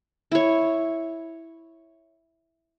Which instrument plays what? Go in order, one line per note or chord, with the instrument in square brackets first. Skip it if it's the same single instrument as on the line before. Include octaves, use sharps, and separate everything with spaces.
[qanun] E4 C#5